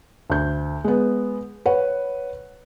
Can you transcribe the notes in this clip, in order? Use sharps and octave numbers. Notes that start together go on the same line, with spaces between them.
D2 G6
G#3 B3
B4 C#5 F#5